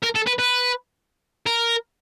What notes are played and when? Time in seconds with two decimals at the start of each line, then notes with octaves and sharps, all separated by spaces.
0.03 A#4
0.15 A4
0.27 B4
0.39 B4
1.47 A#4